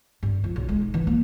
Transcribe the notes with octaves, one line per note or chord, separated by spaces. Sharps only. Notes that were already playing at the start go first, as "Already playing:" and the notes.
G2
F3
B1
G#3
D#4
E3
A#3